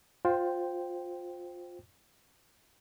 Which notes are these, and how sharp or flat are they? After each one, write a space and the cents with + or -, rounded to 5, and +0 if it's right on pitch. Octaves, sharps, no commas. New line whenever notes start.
F4 +20 C5 +0 G5 +0